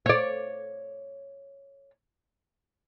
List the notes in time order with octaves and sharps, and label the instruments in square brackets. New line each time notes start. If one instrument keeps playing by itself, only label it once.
[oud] C#5 D5